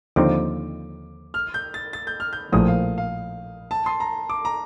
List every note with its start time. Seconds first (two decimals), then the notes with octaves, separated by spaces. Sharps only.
0.16 D#2 D3 F3 C4 D#4 D6
1.34 F6
1.54 G6
1.74 A6
1.93 A6
2.07 G6
2.20 F6
2.33 G6
2.52 A#1 A2 F3 A#3 D#6
2.68 F5
2.98 F5
3.71 A5
3.86 C6
4.00 A#5
4.29 D6
4.45 A#5